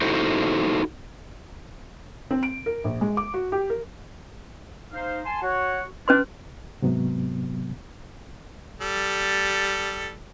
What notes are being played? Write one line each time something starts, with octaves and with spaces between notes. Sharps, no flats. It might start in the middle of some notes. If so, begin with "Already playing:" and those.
D#4 E4 F#4 A4 C5
C4
D7
A#4
A#1
G#3
D6
F#4
G4
A#4
D#4 C5 F5
G#5 A5 C6
F#4 C#5 F#5
C#4 D4 B4 C6
G#2 C3 F#3 B3
G3 A4